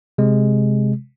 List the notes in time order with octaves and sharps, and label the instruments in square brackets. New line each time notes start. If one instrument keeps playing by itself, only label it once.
[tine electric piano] C3 G#3